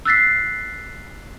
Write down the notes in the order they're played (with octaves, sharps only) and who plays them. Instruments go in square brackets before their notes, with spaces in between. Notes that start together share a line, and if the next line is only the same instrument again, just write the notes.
[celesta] E6 F#6 A6 B6 C7